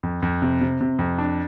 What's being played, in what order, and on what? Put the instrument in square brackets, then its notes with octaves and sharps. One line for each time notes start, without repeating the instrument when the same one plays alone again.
[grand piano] F2
F2
C3
C3
C3
F2
D4